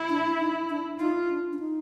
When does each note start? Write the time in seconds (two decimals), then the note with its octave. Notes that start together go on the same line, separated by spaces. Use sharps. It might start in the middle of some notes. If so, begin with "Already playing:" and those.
Already playing: E4
0.09 D4
0.32 D4
0.40 D#4
0.70 D4
0.99 D#4 F4
1.30 D4
1.53 D4
1.59 D#4